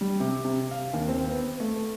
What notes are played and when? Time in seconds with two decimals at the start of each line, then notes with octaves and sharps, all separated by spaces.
0.01 G3
0.20 C3
0.45 C3
0.71 F5
0.94 D#2
1.09 C4
1.31 B3
1.60 A3